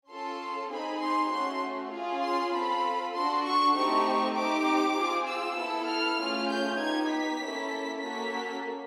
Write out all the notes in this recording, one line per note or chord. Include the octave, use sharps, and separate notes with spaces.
C#4 F4 A4 C6
C4 D#4 G#4 B5
C6
A3 C#4 F#4 C6
C#4 F4 G#4
C6
C4 F4 A4 B5
D4 F#4 A4 C6
C#6
A3 C4 D#4 G4 C#6
C4 D#4 G4 D6
C4 F4 G#4
E6
B3 E4 A4
F6
A3 C#4 F4 G#4
G6
B3 D#4 G4 G#6
B6
A#3 C#4 E4 A4
A#3 C#4 F#4 A4 B6